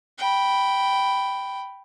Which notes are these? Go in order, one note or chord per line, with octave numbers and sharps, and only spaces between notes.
G5 B5